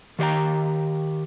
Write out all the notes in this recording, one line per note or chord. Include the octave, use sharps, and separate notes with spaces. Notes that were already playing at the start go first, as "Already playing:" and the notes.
D#3 G4 C5 G5 A#5